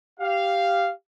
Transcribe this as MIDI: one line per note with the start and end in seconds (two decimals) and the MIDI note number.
0.20 0.92 67
0.20 0.92 77